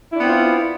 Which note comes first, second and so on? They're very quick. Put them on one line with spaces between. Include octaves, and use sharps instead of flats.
E4 D4 B3 C4 F4